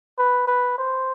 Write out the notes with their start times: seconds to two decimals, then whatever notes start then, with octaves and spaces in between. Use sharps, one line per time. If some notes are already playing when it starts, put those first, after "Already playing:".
0.18 B4
0.47 B4
0.78 C5